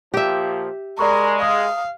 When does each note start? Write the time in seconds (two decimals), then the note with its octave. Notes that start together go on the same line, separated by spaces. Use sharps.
0.14 A#2 F3 G4 E5
0.99 G#3 A#4 D5 B5 C#6
1.42 F5 D#6